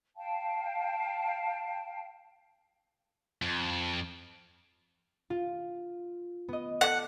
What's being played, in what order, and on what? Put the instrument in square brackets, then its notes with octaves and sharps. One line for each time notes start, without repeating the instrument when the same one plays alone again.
[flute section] F5 G5 A5
[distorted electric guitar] F2
[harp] F4
B3 D#5
[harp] A4 D6 [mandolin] F#5